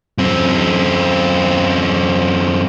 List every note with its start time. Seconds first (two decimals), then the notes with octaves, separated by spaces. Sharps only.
0.18 F#2 C4